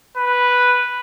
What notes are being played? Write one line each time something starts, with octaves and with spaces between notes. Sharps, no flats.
B4